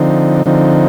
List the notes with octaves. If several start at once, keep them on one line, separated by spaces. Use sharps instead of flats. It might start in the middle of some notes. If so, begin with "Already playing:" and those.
Already playing: D3 F3 C4 D#4
D3 F3 C4 D#4